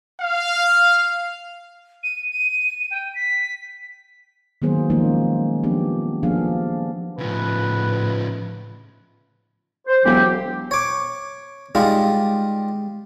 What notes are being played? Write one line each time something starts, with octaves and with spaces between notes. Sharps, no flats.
F5
D#7
D#7
G5
B6
D#3 F#3 A#3 B3 G#4 C5
F3 G#3 A#3 C#4 D#4
F3 B3 D4 G4
F3 A#3 B3 D4 G#4 F5
A2 C#3 F3 B4
C5
E1 F#3 G4
C#5 D6
G3 G#3 D#4 F4